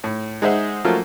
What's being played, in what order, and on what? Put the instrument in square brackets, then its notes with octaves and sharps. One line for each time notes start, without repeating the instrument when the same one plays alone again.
[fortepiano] A2
G#3 D#4 G#4 C5 E5 F#5
F3 F#3 A3 A#3 C#4 F4